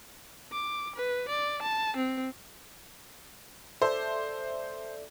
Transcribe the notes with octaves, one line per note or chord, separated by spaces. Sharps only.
D6
B4
D5
A5
C4
A4 C5 D5 E5